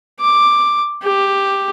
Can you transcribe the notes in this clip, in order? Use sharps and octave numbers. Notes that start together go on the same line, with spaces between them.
D6
G4